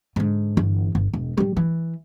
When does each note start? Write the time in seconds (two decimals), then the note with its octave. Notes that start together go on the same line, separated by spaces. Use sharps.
0.16 G#2 D3
0.57 G1 E3
0.95 G1
1.13 E1
1.38 D1 G3
1.57 E3